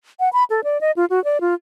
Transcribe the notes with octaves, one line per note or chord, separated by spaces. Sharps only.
F#5
B5
A4
D5
D#5
F4
F#4
D5
F4